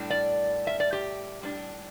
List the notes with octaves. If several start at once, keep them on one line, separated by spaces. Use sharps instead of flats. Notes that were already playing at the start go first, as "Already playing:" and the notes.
Already playing: A2 G3 D4
D5
E5
D5
G4
A2 G3 D4